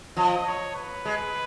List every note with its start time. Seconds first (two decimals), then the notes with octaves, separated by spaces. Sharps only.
0.17 F3 D#5
0.47 C#5
0.76 B4
1.05 G#3